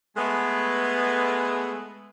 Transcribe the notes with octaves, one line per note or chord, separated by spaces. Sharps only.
G#3 A3 B3